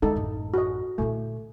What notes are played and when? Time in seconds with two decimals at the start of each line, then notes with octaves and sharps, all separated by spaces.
0.02 G#3 D#4 E4 A4
0.16 A1 F#2
0.54 F#4 D#5
0.98 A#2 A3 E4